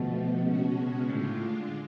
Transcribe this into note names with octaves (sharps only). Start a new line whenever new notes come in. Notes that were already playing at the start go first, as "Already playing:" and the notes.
Already playing: B2 D3 F3 A3
C#3 G#3 C#4 F#4
A2 D3 G#3 D4 F4